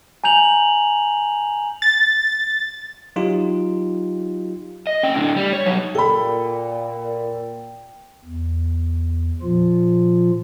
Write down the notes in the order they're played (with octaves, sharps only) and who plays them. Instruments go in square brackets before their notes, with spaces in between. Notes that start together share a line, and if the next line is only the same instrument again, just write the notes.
[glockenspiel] G#5 A#5 G6 F7 F#7
[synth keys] A6
[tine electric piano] F#3 D#4 F4 G4
[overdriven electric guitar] D#5
C#4 G5
A2 D3
G3
C#5
F#3 D#4
[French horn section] A#2 [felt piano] A4 B5 [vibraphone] G5
[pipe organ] E2
A#2 F3 F4